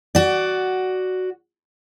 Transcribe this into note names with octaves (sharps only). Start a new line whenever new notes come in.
F#4 D5